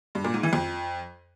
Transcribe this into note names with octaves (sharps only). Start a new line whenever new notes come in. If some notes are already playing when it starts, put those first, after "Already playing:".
G2
A#2
G#2
E3
F2